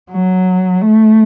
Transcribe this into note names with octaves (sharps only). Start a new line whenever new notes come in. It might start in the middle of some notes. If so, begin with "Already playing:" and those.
F#3
A3